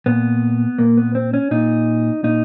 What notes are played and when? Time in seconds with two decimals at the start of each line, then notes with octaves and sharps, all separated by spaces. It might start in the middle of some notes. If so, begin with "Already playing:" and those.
0.06 A#2 B3
0.78 A#2 A#3
0.97 B3
1.15 C4
1.34 C#4
1.51 A#2 D#4
2.24 A#2 D#4